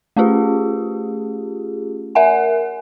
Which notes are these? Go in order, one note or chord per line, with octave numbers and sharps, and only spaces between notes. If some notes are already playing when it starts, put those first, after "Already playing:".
A3 C#4 F4 G4 G#4
A#4 E5 F#5 G#5